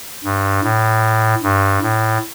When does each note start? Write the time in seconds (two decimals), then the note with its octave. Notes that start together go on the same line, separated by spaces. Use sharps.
0.24 G2
0.63 A2
1.43 G2
1.82 A2